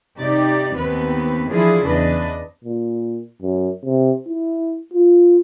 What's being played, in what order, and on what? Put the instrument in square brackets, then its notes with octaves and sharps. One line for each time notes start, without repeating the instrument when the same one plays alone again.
[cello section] C3 D#4 G4 D5
D#2 B3 C4 B4
E3 F3 D4 E4 F4 G#4
E2 C#3 D4 B4 D#5
[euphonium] A#2
F#2
C3
E4
F4